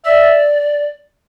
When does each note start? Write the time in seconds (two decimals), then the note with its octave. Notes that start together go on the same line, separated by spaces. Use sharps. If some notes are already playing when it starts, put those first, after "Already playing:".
0.05 D5 E5